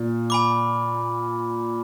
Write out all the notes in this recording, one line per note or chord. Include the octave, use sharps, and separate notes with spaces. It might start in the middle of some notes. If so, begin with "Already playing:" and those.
Already playing: A#2
G#5 B5 D6